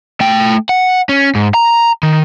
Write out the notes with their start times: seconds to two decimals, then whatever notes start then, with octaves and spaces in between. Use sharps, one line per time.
0.20 A3 G5
0.69 F#5
1.09 C#4
1.35 G#2
1.54 A#5
2.03 D#3